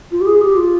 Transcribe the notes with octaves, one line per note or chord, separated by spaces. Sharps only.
F4
G4
G#4
G4
F4